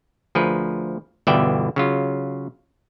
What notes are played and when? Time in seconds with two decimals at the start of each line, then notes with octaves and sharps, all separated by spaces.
0.35 D2 F3 G#4 A#4 B4
1.27 G1 B2 E3 D5 E5 G5
1.76 C#3 F#3 F4